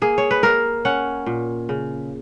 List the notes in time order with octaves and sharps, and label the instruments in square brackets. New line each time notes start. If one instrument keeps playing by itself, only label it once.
[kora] A#3 G#4
C#5
B4
A#3 A#4
C#4 F#5
A#2
C#3